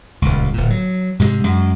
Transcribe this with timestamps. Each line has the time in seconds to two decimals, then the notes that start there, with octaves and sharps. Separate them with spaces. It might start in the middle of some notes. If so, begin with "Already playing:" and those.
0.22 D#1 C#2
0.54 D1 A#2
0.70 F#3
1.19 G#2 C3 D#3 G#3
1.44 F#2 G#3